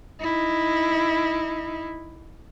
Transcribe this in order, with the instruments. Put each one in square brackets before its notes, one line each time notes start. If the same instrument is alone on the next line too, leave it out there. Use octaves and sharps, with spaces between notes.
[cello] D#4 E4